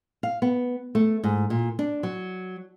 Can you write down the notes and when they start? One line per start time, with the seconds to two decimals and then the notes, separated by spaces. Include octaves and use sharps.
0.23 F5
0.42 B3
0.95 A3
1.24 G#2
1.50 A#2
1.79 D4
2.03 F#3